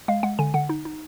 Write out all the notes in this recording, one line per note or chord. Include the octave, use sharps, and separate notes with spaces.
G#3 F5
G#3 F#5
D3 G#5
D3 F#5
D#4
D#4